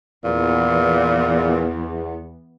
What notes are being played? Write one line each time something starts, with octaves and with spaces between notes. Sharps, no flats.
E2 A#2 E3 B3